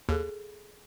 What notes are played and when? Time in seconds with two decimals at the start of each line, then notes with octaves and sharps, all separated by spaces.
0.09 D#2 G#4 A4